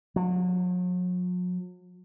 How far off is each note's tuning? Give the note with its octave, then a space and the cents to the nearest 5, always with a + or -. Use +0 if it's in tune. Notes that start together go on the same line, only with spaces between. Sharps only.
F#3 -45